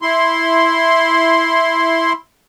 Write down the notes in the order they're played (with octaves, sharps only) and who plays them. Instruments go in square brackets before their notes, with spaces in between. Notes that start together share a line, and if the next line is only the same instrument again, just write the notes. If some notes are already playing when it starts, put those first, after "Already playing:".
[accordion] E4 C6